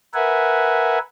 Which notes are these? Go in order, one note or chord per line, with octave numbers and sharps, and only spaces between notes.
A#4 B4 E5 F#5 G#5